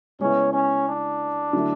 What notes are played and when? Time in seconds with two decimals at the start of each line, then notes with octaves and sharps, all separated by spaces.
0.19 C#3 G#3 B3 C#4 E4
0.53 C#4
0.87 D4
1.53 D3 F#3 A3 E4